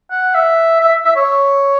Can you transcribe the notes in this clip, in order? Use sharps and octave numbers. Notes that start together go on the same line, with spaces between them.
F#5
E5
E5
E5
C#5